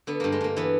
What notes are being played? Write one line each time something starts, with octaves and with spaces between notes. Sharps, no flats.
D3 B3
G2 A#3
G#3
G2 A#3
E3 B3